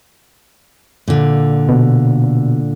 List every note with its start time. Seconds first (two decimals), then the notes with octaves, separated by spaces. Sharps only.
1.08 A#2 D3
1.69 B2